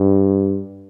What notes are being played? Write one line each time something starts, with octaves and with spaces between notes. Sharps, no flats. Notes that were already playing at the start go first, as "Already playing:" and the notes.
Already playing: G2